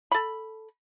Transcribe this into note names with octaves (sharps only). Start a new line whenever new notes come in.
A4 B5